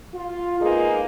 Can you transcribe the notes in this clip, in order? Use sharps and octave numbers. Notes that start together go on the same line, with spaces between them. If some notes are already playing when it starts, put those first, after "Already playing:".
F4
G#3 A#3 B3 D#4 G#4